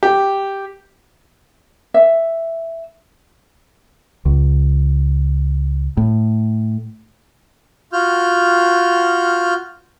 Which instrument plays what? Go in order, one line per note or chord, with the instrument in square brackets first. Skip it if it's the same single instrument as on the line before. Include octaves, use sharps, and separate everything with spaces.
[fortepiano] G4
[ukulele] E5
[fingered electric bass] C#2
A2
[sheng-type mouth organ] F4 F#4 F6 G6